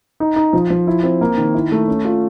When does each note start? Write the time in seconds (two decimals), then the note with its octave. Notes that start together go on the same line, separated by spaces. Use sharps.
0.20 D#4
0.36 D#4
0.53 F3
0.70 F3
0.87 E4
1.03 C4
1.21 A#3
1.37 D#3
1.54 E4
1.72 A3
1.88 C#4
2.05 F4